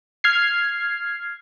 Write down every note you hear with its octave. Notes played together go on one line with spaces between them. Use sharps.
F6 G#6 C7